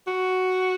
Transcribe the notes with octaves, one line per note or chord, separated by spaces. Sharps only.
F#4